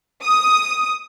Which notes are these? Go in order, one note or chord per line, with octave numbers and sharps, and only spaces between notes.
D#6